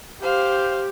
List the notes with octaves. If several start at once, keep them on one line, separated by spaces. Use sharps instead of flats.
G4 C5 F5